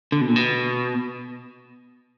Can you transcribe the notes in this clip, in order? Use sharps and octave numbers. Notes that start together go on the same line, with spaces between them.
D3
B2
A#2
B2